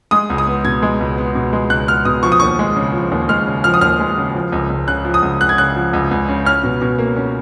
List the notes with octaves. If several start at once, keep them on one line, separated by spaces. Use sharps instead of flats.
G#3 D#6
C#2
D#6
B3
B2 G#6
G#3
C#2
B3
B2
G#3
C#2 F#6
B3 F6
B2 D#6
F3 C#6
D#6
D#2 C#6
G#3
C#3
F3
D#2
G#3 F6
C#3
F3 F6
D#6
D#2 F6
G#3
C#3
F3
C#2
C#2
C#3 F#6
F3
D#6
C#2
C#2 F#6
G#6
C#3 F#6
F3
C#2
C#2
C#3
C#4 F6
B2
B2
A#3
C#4